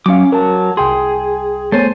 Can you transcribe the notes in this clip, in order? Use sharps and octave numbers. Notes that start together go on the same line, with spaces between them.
F#3 C#4 F5 D6
F#3 A#4 A5
C2 G#4 G5 C6
A3 B3 C5 C#5 G#5 A6